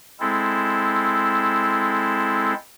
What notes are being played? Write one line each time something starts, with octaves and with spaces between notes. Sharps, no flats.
G#3 C4 E4 A4